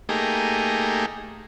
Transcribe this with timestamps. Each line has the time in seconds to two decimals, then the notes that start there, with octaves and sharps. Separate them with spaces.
0.09 A3 A#3 D#4 G4 G#4